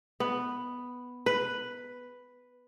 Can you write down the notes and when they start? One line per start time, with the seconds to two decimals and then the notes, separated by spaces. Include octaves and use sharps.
0.20 B3
1.26 B4